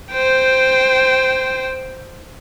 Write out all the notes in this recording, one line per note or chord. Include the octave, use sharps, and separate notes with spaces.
C5 G5